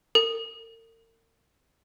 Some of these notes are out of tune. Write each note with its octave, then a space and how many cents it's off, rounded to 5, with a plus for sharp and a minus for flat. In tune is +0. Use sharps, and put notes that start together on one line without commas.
A#4 -45